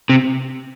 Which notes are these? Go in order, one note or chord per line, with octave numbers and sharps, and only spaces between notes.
C3